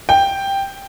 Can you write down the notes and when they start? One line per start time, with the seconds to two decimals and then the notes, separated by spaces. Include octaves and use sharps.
0.09 G5